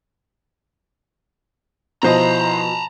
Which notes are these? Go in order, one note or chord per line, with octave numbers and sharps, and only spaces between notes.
B2 F3 E4 C5 D#5 A5 A#5